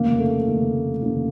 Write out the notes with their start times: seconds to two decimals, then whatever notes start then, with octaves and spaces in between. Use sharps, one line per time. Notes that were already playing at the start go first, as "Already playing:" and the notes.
Already playing: F1 D#2 C#3 A#3
0.19 A3
0.47 F1 D#2 C#3
1.02 F1 D#2 C#3